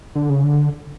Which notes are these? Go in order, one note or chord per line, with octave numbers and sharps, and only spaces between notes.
D3
C#3
D3